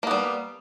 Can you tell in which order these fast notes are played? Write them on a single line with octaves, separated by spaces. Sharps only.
A#3 B3 G3